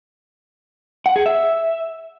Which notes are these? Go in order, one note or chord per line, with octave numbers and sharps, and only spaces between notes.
F#5
G#4
E5